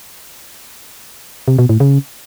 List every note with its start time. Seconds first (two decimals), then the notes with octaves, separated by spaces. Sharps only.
1.48 C3
1.59 B2
1.69 A2
1.80 C#3